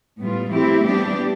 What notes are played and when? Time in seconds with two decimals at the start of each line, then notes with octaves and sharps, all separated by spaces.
0.20 A2 G3 B3 F4
0.51 F3 A3 C4 E4 G4
0.83 G3 B3 D4 G4